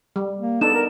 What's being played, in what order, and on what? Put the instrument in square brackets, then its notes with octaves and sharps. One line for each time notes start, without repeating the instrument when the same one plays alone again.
[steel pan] G3
[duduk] A#3
[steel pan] B3 D4 D#4 [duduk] A4 [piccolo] E7
[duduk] A#4